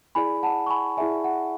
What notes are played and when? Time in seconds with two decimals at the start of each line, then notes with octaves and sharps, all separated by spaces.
0.15 E4 G#4 D5 G#5 B5
0.43 F#5 A5
0.66 C#6
0.70 G#5 B5
0.97 E4 G#4 D5 E5 G#5
1.24 F#5